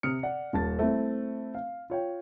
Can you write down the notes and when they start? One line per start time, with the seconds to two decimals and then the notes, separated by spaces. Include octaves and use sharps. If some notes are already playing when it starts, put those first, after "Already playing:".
0.03 C3 D#6 F6 C#7
0.23 D5 F#5
0.53 D#1 A5 A6
0.79 A3 C4 E4
1.55 F5
1.90 F4 C#5 G5